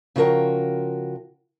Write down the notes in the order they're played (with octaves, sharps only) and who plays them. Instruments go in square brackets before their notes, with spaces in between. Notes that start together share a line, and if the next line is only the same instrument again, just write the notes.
[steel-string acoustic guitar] C#3 F3 F#4 A#4 G5